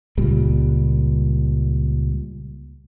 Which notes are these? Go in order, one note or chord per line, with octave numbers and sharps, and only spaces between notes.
C#2 A#2 G3